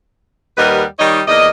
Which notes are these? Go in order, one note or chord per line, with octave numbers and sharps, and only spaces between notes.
D#2 G3 A#4 B4 D#5 F#5
D#3 G3 D#4 C#5 D#5
E2 A#3 D5 D#5